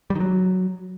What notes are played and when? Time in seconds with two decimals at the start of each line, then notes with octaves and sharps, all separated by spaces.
0.10 G3
0.15 D#3
0.20 F#3